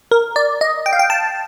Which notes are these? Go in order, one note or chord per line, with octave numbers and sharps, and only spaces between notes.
A#4
D5
D#5
G5
F5
G5
A5